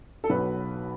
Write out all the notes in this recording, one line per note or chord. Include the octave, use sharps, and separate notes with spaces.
A4
B1 B2 F#3 B4